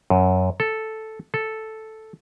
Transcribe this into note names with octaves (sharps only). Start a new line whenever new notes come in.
F#2
A4
A4